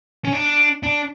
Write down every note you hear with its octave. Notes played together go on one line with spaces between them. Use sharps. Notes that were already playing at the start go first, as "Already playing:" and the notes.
C#4
D4
D4